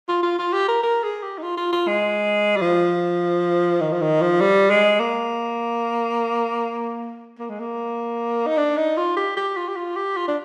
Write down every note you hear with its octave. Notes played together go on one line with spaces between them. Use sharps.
F4
F4
F4
G4
A#4
A#4
G#4
G4
D#4
F4
F4
F4
G#3
G3
F3
D#3
F3
D#3
F3
G3
G#3
A#3
A#3
G#3
A#3
D#4
D4
D#4
F4
G4
G4
F4
G4
F4
G4
F4
D4